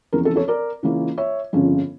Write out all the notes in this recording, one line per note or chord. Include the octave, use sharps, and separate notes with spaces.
F1 E2 C#3 A#4
A4
A4 C#5
A#4 D5
C#2 C#3 E3 A#3 C#4
C#5 E5
G1 F2 C#3 F3 C#4